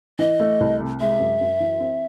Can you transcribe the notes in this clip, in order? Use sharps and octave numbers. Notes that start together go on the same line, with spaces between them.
E3 D#5
A3
C2
C3
G#3 E5
F#2
F#2
E3
C4